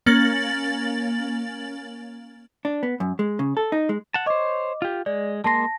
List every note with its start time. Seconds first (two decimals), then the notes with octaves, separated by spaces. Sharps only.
0.06 A#3 C#4 A6 F#7
2.65 D4
2.83 B3
3.00 F#2
3.19 G#3
3.39 C#3
3.57 A4
3.72 D#4
3.89 G#3
4.14 F#5 A5
4.26 C5 C#5 D#5 D6
4.82 F4 G4
5.06 G#3 D5
5.44 G#3 A#3 A5 C6 A#6